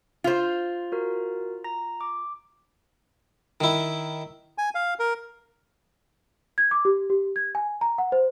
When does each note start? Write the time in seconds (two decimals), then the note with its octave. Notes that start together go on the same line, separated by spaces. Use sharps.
0.24 F4 C5
0.92 F#4 A#4
1.64 A#5 A#6
2.01 D6
3.61 D#3 E4
4.58 G#5
4.75 F5
4.99 A#4
6.58 G#6
6.71 D6
6.85 G4
7.10 G4
7.36 G#6
7.55 G#5
7.81 A#5
7.98 F#5
8.12 C5